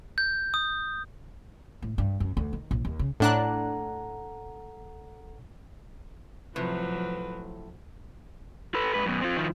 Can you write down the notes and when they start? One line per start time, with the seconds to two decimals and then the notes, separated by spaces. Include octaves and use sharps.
0.18 G6
0.54 D#6
1.82 A2
1.98 G2
2.20 F#2
2.37 D2
2.53 D#3
2.71 A#1
2.85 D#2
2.99 C#3
3.20 A2 D4 A4 F#5 A#5 F#6
6.56 A2 C3 F3 F#3 B4
8.74 A4 B4
8.94 G#2 B4
9.06 F#2 B2
9.21 C4 F4
9.37 D#3 F3